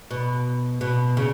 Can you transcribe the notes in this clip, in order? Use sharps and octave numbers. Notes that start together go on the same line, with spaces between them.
B2
B2
C#3